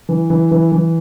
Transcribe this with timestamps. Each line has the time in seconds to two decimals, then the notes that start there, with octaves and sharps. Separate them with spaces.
0.09 E3
0.30 E3
0.51 E3
0.72 E3